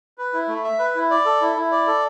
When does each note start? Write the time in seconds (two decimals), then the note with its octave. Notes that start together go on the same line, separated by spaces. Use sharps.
0.18 B4
0.33 E4
0.48 A3
0.64 E5
0.79 B4
0.95 E4
1.10 D5
1.25 A4
1.41 E4
1.56 E4
1.71 D5
1.87 A4